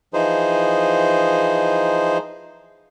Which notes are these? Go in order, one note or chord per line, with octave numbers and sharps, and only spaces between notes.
E3 F3 D#4 G#4 C5